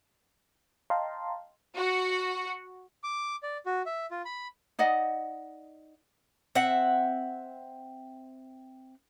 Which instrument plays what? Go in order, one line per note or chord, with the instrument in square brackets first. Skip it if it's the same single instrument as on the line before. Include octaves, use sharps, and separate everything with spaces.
[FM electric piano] D#5 F5 G5 A5 A#5 C6
[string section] F#4
[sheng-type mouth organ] D6
D5
F#4
E5
F4
B5
[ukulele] D#4 D5 D#5 F#5
[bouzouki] C4 E5 F#5